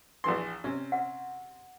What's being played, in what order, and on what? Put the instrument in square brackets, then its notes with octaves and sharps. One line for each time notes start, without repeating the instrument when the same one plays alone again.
[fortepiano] A#1 E3 C6
C3 C#4
[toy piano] F#5